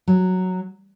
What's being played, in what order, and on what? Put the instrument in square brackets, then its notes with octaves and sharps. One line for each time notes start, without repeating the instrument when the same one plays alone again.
[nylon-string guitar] F#3